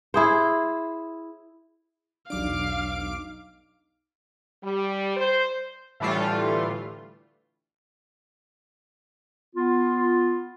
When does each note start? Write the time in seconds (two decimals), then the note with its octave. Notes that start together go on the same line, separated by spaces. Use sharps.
0.14 E4 G#4 C5
2.30 B1 E2 F#3 D4 D#4 F5 D6 D7
4.64 G3
5.17 C5
6.00 A2 D3 E3 G3 A3 F4
9.55 B3 F4